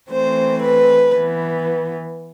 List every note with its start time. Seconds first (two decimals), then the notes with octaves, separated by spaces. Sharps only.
0.11 E3 A3 C4 C5
0.62 B4
1.12 E3 B3